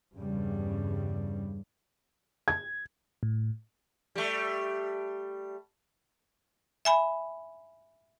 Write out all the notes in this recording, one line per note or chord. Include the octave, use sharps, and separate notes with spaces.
E2 G2 C#3 G3
G#6
A2
G3 A3
E5 G#5 B5